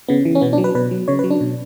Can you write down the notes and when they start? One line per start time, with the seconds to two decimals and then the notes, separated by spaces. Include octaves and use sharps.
0.08 C#3 B3
0.25 E3
0.35 C#4
0.41 B2 B3
0.53 D4
0.58 F#3
0.64 B4
0.75 B2 B4
0.91 F#3
1.08 C#3 C#5
1.19 B4
1.24 F#3
1.30 D4
1.41 B2